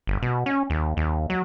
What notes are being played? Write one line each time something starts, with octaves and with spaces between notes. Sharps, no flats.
G1
B2
C#4
D#2
D#2
F#3